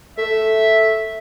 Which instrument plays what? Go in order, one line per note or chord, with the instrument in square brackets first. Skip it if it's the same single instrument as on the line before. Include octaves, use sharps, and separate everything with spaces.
[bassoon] A3 [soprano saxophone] E5